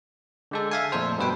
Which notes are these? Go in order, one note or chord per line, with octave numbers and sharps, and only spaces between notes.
D3 G#3 A4
E5 F5 G#5
F2 A#2 A3 A4 C5
G2 B2 B4 G5